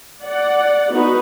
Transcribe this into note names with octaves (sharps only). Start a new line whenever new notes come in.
D5 F#5
B3 D#4 F#4 B4